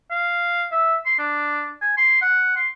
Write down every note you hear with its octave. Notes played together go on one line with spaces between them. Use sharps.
F5
E5
C6
D4
G#5
C6
F#5
C6